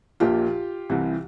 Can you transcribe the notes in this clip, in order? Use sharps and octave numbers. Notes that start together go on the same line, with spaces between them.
A#1 A#2 F4 G4
C2 C3 E3